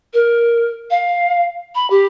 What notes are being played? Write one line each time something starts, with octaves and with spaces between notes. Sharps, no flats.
A#4
F5
B5
G4